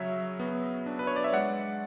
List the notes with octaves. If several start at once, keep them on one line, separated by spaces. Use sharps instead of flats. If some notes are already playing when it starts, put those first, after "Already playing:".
Already playing: C#3 F#3 C#5 E5
B3
D4
B4
C#5
D5
E5
G#3 D5 F#5